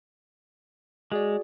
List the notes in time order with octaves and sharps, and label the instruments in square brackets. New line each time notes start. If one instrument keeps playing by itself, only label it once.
[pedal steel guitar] G#3 [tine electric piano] F#4 G#4 D5